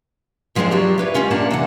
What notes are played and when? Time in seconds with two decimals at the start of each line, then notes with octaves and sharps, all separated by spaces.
0.55 F#2 F3 G#3 A#3 C4 D4
0.71 F#3 D4 F4 G4
0.98 E4 B4 C#5
1.14 G3 G#3 C#4 F4
1.30 A#2 A#3 D4 F4 F#5 A5
1.51 C3 E3 F#5